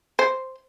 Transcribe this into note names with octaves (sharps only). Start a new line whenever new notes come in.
C5